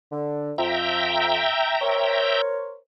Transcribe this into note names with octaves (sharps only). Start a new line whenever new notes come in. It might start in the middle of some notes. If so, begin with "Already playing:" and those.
D3
F2 F3 E5 G5 A#5
A#4 C5 C#5